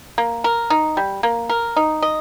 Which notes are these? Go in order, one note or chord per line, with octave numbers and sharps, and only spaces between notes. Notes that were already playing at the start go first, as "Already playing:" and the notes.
A#3
A#4
D#4
G3
A#3
A#4
D#4
D#5